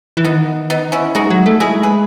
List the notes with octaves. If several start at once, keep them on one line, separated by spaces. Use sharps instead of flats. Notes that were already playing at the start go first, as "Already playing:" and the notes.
E3
D#3 B3 D#4
B3 D#4
C#4 E4
G#3 D#4 F#4
F#3
A3
G#3 E4 G#4
G#4 B4